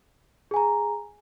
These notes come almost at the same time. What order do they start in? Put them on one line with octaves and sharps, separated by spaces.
G#4 G#5 A#5